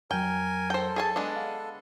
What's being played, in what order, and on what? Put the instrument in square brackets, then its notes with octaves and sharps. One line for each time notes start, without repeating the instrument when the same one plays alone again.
[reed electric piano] F2 F#3 [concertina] A#4 G#5 [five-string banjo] G5
[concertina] A4 [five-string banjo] C5 G5
[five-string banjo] G#4 G#5 A5
G#3 B3 D4
[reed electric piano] F5